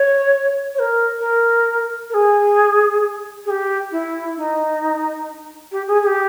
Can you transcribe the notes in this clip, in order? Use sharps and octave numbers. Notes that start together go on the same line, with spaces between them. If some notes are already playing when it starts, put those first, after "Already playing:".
Already playing: C#5
C#5
A#4
A#4
A#4
G#4
G#4
G4
E4
D#4
G4
G#4
G#4
G4